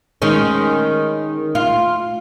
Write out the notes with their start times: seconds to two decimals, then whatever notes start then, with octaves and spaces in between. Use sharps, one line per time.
0.22 D#3 G#3 C#4
1.55 F4